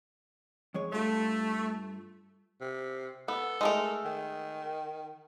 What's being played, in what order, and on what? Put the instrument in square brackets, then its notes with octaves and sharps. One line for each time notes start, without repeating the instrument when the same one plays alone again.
[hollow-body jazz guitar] F2 G#3 C#5
[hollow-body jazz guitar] G2 F4 [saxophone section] A3
[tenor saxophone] C3
[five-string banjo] B3 [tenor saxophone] A4
[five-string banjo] G#3 A3 A#4
[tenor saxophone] D#3